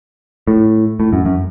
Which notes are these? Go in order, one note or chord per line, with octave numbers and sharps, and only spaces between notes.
A2
A2
F#2
F#2